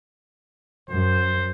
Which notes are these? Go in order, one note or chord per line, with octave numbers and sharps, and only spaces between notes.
F#2 C5